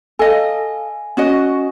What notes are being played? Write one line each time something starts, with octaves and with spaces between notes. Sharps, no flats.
A4 D#5 F5 G#5
C#4 F#4 D#5